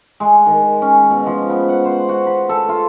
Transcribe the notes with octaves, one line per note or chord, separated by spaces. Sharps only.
G#3
D#3
C#4
B2
F3
B3
F#5
C5
F#4
B5
A4
F4